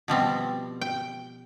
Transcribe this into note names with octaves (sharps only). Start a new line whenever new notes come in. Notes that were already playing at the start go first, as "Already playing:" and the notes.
B2 F3 G3 C4
G5